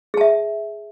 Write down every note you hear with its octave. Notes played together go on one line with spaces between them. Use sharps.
G#4 E5 A5